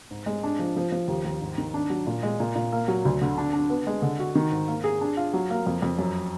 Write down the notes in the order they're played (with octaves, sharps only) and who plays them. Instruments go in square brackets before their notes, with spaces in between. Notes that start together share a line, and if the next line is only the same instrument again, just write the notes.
[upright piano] G#2
G#3
D4
F3
F3
F3
D#2
D#2
G#2
D#3
D4
F#3
A#2
G#3
A#2
A#2
A#3
F#3
D2
D3
D4
D4
B3
G#3
D3
F#4
D#3
G#2
A#3
G#4
D4
F4
F#3
A#3
F2
F2
F#2